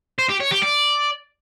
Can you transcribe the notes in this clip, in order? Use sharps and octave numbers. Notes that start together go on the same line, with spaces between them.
C5
G4
C#5
G4
D5